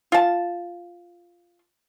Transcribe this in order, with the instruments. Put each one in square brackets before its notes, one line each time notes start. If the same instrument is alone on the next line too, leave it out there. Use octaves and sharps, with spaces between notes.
[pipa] F4 A5